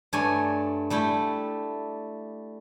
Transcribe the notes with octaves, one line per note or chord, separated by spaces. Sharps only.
G2 A3 C#5 D5 G#5
G3 A3 E4 G5